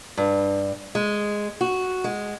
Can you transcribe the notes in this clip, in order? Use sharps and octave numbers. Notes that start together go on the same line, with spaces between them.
G2
G#3
F#4
G#3